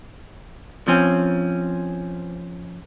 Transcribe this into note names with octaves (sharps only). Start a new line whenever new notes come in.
F3 C4 C#4